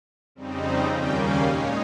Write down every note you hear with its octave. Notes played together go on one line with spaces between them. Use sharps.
F2 C#3 G3 C4 D#4
D#2 C#3 G3 A#3 C#4 G5
F5
A#2 G#3 D#4 C#5